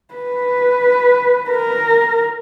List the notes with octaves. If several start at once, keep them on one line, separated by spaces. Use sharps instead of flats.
B4
A#4